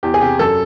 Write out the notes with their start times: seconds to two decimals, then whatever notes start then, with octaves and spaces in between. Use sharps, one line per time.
0.03 E2 G4
0.14 G#4
0.21 C3 G4
0.39 F#2 A4